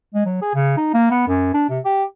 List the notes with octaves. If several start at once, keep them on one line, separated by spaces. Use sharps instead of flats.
G#3
F#3
G#4
C#3
D#4
A#3
B3
F#2
D4
C3
G4